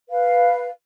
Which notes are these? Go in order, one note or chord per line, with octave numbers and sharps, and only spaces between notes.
B4 F5